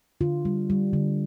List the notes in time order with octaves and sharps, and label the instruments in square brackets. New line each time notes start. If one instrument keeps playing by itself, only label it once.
[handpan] D3 F4
G3
G3
D3